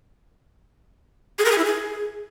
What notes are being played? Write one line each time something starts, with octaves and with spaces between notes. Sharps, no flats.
G#4
A#4
G#4
E4
G#4